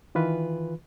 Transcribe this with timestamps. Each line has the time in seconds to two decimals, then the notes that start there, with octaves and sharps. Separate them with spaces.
0.15 D#3 E3 F4 B4